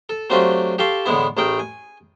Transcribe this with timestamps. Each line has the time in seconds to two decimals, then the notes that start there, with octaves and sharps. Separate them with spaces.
0.09 A4
0.30 F#3 A3 C4 D4 F4 G4
0.78 G4 A4 F5 A5 C6 C#6
1.06 A2 D3 E3 G#3 B3 E4
1.37 A1 A3 G#4 A#4 G5
1.59 G#5